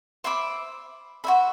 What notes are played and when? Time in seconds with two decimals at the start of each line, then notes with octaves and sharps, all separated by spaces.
0.24 C5 E5 B5 D6
1.24 F#4 C5 E5 B5